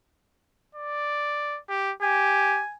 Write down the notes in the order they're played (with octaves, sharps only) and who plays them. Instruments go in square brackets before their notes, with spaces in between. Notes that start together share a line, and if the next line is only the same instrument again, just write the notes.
[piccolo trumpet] D5
G4
[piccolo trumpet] G4 [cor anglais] G#5